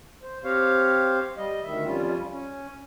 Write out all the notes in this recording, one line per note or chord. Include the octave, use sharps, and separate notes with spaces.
C5
C4 G4 C5 C#5 F5
G3 D#5
D2 D#3 E5
F2 G3 C#4 F4
C#4